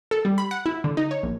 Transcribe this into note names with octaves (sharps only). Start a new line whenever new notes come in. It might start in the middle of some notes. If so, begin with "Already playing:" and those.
A4
G3
B5
F#5
E4
D3
D#4
C#5
A#1